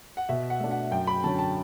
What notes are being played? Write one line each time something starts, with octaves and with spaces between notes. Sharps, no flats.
F#5
B2 E5
F#5
A3 D4
F#5
F#2 G5
B5
D3 F#3 C#4 A5
A5